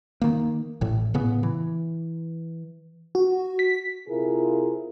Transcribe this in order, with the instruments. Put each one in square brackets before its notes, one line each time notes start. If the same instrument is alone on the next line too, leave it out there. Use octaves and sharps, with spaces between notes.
[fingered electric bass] D#3 A#3
A1 A2
A2 C#3 B3
E3
[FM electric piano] F#4
B6
[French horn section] C3 E4 F4 G#4 A#4